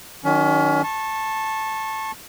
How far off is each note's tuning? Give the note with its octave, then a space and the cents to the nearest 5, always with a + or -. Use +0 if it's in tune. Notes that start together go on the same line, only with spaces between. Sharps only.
D#3 +0 F#3 +0 C#4 +35
A5 +0 C#6 -30